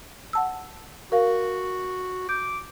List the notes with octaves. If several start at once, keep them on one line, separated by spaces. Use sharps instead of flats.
F#5 A5 E6
F#4 A#4 F5
D6 G6